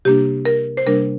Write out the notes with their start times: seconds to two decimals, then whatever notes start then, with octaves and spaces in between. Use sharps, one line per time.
0.05 C3 G3 A#3 D4 G4
0.45 A#4
0.77 C5
0.86 C3 G3 A#3 D4 A#4